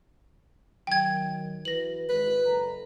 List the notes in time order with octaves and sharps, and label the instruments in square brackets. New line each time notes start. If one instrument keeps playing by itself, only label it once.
[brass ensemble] D#3 F#3 [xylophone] G5 G#6
[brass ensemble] E3 F#4 B4 [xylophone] A#6 F#7
[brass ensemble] G#1 [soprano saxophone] B4
[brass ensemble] F#1 A4 A#5